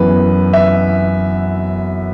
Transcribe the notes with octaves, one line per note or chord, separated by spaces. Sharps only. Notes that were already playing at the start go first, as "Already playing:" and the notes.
Already playing: F#2 E3 B3 B4
E5